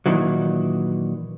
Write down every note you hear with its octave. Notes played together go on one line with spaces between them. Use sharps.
A#2 D#3 E3 F#3